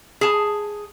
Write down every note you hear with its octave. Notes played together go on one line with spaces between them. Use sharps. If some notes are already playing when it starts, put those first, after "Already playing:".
G#4 A5